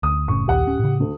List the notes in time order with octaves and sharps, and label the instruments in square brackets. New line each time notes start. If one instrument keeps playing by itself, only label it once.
[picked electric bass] D2 [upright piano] D#6
[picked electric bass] F#1 A2 C#3 [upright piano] C#6
[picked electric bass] A#1 D#2 [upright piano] G4 F#5
[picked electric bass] D1 C#4
A2 C#3
[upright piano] D2